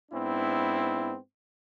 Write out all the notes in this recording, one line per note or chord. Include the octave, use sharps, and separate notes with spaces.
G#2 B3 C4 D4 E4